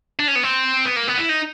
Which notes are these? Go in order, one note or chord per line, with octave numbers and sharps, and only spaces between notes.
D4
C#4
B3
C4
B3
A#3
B3
E4
D#4